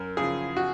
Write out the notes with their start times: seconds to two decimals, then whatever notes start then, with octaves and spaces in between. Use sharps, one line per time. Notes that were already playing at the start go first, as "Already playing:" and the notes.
Already playing: F#2 A#4
0.17 C#3 F3 G#4
0.57 F#4